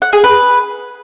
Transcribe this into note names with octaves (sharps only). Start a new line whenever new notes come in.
F#5
G#4
B4